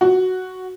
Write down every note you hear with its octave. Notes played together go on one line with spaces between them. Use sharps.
F#4